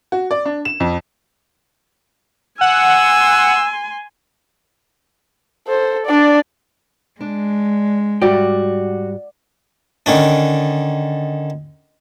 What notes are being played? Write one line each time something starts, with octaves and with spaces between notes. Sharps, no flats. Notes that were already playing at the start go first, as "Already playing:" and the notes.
F#4
D5
D4
E7
F2
F#5 G#5 C6 E6
A4 C5
D4 D5
G#3 D4
G#2 G3 F#4 D5 G5
D3 D#3 C#4 D4